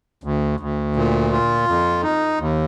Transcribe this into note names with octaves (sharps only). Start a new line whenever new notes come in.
D2
D2
A#2
F4
F2
D#4
D#2